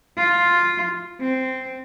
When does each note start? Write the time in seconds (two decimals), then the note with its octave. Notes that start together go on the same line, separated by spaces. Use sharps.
0.18 F4
1.21 C4